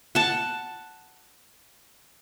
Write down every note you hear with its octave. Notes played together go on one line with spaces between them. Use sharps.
F#5 A5